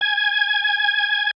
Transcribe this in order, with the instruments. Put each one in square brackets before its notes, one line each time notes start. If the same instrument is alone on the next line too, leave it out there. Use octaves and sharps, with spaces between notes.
[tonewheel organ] G#5 G#6